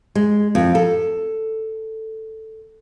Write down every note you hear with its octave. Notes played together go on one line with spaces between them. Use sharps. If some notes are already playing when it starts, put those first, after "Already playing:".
G#3
F2
A4